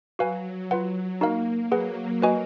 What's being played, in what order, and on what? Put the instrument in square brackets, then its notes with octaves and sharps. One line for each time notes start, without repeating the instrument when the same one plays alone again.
[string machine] F#3 [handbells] F#4 B4 F5 G#5
[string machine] F#3 [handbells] F4 B4 F#5
[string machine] A#3 [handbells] D#4 F#4 A#4 F5
[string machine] F#3 [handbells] G#4 B4 F#5
[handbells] F#4 B4 D#5 G#5